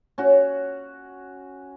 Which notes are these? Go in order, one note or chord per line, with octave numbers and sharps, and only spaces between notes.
C#4 F#4